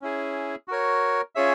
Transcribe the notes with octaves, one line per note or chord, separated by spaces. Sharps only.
C#4 E4 G#4
F#4 A#4 C#5
C#4 F4 G#4 C#5 E5